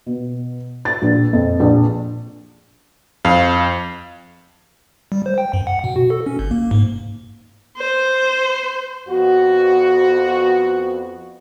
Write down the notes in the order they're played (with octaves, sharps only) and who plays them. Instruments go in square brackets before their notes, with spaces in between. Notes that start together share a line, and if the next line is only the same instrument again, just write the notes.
[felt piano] B2
A6
A#1
F2
A#1
[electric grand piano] F2 [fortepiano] F5
[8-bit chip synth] G3
C5
G5
F#2
F#5
B2
F#4
A4
C#4
G1
A#3
G#2
[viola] C5
[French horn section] F2 B3 F#4